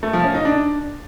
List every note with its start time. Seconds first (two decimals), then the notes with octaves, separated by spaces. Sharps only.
0.03 A3
0.13 F3
0.24 C#4
0.35 D#4
0.45 D4